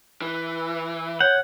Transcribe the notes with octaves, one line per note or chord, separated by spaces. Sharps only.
E3 B4
C#5 F#5 G6